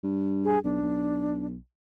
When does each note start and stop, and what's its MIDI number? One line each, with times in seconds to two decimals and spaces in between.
0.04 0.57 43
0.44 0.59 68
0.64 0.78 35
0.64 1.46 62
0.82 1.55 35